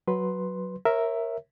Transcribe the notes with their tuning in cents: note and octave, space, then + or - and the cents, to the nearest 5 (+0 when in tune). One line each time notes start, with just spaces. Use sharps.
F#3 +0 B4 +0 C6 +0
A#4 +0 C#5 -35 E5 +0